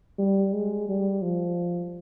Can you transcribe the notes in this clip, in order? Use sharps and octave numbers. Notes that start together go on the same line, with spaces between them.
G3
G#3
G3
F3